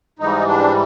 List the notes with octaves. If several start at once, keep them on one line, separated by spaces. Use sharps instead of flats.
G#2 E3 G3 D#4
D4